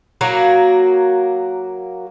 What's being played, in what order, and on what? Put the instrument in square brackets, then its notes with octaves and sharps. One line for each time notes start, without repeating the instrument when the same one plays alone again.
[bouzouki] F#3 A#3 F#4